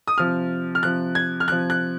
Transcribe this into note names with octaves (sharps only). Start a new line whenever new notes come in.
D#6
C3 F3 F6
F6
C3 F3 F#6
G#6
F6
C3 F3 F#6
F#6